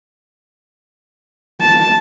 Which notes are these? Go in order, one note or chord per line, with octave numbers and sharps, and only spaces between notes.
A5